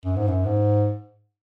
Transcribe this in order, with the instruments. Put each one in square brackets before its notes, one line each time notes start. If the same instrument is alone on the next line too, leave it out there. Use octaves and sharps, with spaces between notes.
[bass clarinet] F#2
G#2
F#2
G#2